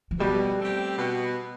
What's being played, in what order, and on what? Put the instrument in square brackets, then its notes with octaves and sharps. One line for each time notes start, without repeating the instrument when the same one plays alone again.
[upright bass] F3
[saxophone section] B2 [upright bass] G3
[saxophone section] A3 C4 G4
B2